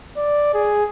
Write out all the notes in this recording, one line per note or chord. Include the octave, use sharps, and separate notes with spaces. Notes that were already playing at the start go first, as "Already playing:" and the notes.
D5
G#4